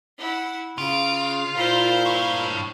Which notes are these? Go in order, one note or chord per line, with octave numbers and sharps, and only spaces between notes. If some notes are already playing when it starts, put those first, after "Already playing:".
E4 F#5
C#3 F4 D7
A#2 E4 A#4 C5 F5
G2 C#5